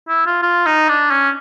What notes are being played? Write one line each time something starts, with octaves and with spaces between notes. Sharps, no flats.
E4
F4
F4
D#4
D4
C#4